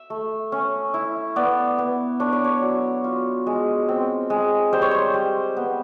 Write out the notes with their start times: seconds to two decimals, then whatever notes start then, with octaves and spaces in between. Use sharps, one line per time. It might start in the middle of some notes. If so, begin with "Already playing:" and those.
Already playing: E5
0.10 A3
0.52 C#4
0.94 E4
1.36 B3 D5
1.78 B3
2.20 D4 C#5
2.32 D5
2.44 C#5
2.62 F#3
3.04 F4
3.47 G#3
3.89 C4
4.30 G#3
4.73 G3 C5
4.82 C#5
4.91 C5
5.14 G3
5.57 B3